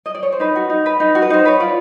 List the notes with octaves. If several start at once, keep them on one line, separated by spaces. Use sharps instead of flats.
D#5
D5
C#5
C5
D#4 B4
F#4
D#4
B4
D#4
F#4
B4
D#4 C5
B4 C#5
F4 D5